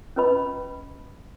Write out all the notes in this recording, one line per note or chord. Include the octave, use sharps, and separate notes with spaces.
C#4 F4 B4 D#5 B5